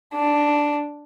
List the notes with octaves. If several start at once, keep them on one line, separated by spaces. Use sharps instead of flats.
D4